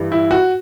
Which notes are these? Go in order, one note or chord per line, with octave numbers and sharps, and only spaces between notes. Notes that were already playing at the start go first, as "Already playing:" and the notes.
Already playing: G2 E3 G3
E4
F#4